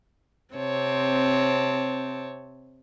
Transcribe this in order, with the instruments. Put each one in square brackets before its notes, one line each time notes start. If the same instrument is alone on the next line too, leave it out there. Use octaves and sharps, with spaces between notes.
[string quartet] C3 C#5 A5 [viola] C4